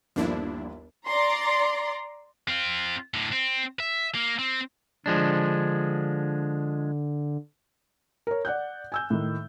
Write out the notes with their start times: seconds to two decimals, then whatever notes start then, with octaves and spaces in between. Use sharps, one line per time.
0.16 G1 D#2 F3 D4 E4
1.08 D5 A#5 C6
2.48 C4 F4
3.14 A2 D3
3.32 C4
3.80 E5
4.15 A#3
4.39 C4
5.06 D3 F3 G#3 D4
8.27 A#4 C#5
8.45 D5 F#5 F#6 G6
8.92 G#5 E6 G6
9.10 A2 D#3